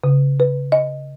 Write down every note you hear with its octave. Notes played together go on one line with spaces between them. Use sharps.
C#3
B4
D#5